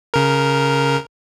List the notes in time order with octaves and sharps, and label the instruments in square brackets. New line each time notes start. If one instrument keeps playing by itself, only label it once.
[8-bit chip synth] C#3 A#4